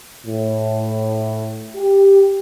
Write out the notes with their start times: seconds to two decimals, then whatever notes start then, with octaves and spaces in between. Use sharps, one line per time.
0.26 A2
1.77 G4